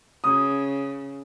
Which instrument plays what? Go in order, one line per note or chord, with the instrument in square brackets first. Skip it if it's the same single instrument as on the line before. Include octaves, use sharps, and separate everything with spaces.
[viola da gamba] C#3 [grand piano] D#6